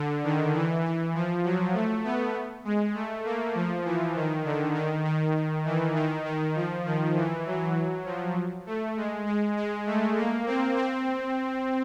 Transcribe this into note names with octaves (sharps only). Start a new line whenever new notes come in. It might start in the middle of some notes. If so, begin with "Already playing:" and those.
Already playing: D3
D#3
E3
E3
F3
F#3
A3
B3
G#3
A3
A#3
F3
E3
D#3
D3
D#3
D#3
E3
D#3
D#3
F3
D#3
E3
F#3
F3
A3
G#3
G#3
G#3
A3
A#3
C4
C4